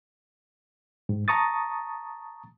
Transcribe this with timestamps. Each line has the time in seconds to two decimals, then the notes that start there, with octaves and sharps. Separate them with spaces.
1.09 G#2
1.28 A5 A#5 C#6 D#6 A6